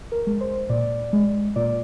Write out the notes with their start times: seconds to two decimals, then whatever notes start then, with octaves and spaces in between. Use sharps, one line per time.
0.12 A#4
0.27 G#3
0.41 C5
0.69 A#2 D5
1.13 G#3
1.56 A#2 D5